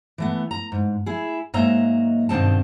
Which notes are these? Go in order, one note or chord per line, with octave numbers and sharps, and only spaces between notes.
E3 A3 B3
A#5
G#2
E4 G#4
G#2 F#3 A#3 D#5 E5 A#5
G2 B2 D#3 C4 D#4 A5